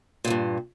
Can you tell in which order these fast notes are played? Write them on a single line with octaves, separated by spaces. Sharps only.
A#2 E2 G2